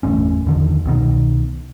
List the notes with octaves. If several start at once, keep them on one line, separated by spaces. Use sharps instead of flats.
G1 E2 A2 C#4
E2 D3 D#3 F3
C2 B2 D#3